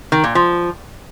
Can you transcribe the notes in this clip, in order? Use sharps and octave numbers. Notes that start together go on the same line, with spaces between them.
D#3
A#2
F3